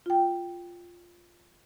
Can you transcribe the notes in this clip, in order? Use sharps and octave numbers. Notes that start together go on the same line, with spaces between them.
F4 G5